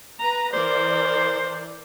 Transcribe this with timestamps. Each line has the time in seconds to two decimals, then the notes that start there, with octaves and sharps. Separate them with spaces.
0.22 B4 A#5
0.53 E3 A#4 C5 D5